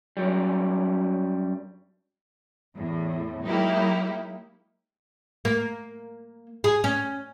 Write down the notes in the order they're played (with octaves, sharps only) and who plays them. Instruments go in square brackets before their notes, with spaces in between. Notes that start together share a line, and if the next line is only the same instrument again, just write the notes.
[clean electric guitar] F#2 F#3 G3
[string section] E2 A2
F#3 G#3 A#3 D#4 E4 G4
[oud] A#3
G#4
C#4